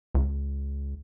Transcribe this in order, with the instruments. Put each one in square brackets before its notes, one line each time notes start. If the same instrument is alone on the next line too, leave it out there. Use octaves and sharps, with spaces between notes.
[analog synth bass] C#2